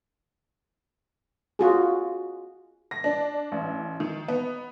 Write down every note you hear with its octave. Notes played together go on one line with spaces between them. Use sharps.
F4 F#4 G#4
A#6
D4
A1
D#3
B3